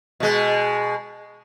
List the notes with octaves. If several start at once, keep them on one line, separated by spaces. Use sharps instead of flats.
B2 G#3